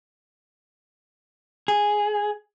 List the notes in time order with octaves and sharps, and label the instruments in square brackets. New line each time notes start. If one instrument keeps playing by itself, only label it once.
[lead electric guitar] G#4